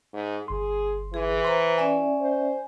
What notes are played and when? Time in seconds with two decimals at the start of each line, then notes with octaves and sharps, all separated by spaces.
0.13 G#2
0.48 G1 G#4 C6
1.14 E3 G#4
1.45 C5 A#5 C6
1.78 C#4 D5 E5 G#5
2.21 C5